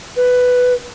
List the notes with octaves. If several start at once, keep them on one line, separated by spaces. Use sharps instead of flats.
B4